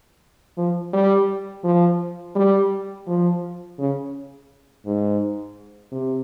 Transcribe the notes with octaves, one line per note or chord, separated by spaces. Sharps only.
F3
G3
F3
G3
F3
C#3
G#2
C3